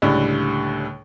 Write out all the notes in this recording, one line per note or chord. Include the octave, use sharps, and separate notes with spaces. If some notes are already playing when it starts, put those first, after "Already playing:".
C#2 A2 D3 G3